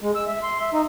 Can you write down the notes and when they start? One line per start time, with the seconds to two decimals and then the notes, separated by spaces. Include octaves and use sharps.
0.01 G#3
0.15 E6
0.27 E5
0.43 C6
0.60 E5
0.73 D#4